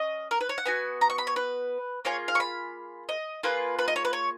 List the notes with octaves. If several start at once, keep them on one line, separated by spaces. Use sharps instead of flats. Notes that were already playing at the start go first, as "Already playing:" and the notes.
Already playing: C#4 D#5
A#4
B4
C#5
F#5
B3 F#4 G#5
A#5
C#6
B5
C#5
B4
A#3 F4 G#4 C#5
F5
C#6
B5
D#5
A#3 F4 G#4 B4
B4
D#5
C#5
B4
C#5